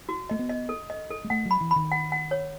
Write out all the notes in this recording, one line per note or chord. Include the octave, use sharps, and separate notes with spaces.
F#4
A3 D#5
B3
D#5
A4
D#5
A4
G#3
A3 F#5
F#3
B5
E3
B5
D#3
F#5
F#5
C#5